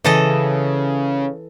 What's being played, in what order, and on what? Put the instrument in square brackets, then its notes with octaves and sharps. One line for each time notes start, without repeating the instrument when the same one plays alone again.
[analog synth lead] C#3 [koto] E3 A4 D#5